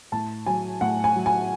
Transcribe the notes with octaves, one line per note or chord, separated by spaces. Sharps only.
A2 A5
F#3 G#5
A2 F#5
G#5
F#3
G#5